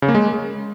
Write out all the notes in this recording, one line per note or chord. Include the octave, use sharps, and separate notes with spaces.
C#3
A#3
G#3